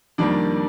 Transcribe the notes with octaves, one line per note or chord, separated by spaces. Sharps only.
F2 D#3 G3 A#3 D4 D5